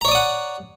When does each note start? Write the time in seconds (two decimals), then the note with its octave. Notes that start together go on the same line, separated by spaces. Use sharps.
0.01 A#5
0.05 C#5
0.08 D5
0.11 D#6
0.15 F#5